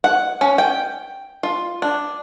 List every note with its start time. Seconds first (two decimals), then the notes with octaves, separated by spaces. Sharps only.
0.04 F#5
0.41 C#4
0.58 G5
1.43 F4
1.82 D4